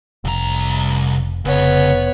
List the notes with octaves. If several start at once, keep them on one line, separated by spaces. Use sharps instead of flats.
F1 C2 A#5
F1 C#2 B3 C#5